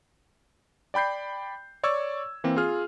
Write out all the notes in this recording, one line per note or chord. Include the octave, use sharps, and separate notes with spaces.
D5 G5 B5 G6 C7
C#5 D5 C#6 E6 G#6
E3 A#3 C4
F4 G#4 F6